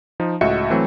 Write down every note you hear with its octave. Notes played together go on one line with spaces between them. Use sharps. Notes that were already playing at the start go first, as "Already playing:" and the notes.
F3 D#4
C#2 A2 F#4 D#5 E5 C#7
E3 F#3 A3 C4